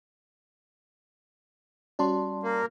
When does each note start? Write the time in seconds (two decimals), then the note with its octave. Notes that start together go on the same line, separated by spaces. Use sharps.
1.99 G3 C#4 F#4 D5 A5 C6
2.43 A#3